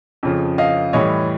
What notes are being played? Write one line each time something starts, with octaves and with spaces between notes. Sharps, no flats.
F2 C#3 F3
D#5 F5
A2 E3 G3 C#5 D#5